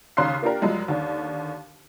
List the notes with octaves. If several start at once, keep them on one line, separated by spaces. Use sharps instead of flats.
D#2 C#3 A#5 C6 F#6 C7
A#3 D4 F4 G4 A#4
F#2 F3 G3 G#3
D#2 D3